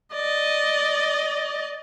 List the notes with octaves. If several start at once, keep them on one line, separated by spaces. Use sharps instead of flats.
D5 D#5